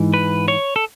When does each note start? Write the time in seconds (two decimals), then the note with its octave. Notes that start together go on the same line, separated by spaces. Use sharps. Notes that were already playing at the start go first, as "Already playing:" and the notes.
Already playing: G#2 E3
0.14 B4
0.48 C#5
0.76 A4